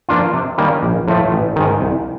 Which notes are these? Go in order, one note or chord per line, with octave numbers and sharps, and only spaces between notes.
F3 A#3 D4 F4
C3
D#3 G3 A#3 C#4
A#1
A2 F3 A3
A1
G#2 D#3
C2